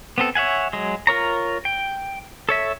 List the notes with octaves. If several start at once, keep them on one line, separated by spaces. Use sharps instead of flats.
B3 C4 A4
C#5 E5 F#5 G#5
F#3 G#3
F4 A#4 C#5 A#5
G5
A4 C#5 E5